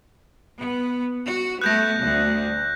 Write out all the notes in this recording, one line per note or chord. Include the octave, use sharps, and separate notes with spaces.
B3
F#4
A3 B3 F#6 G6 A#6
D2